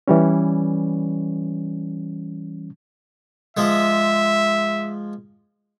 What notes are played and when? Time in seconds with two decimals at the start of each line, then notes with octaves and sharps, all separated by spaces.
0.08 E3 G3 C#4
3.57 F3 G#3 E5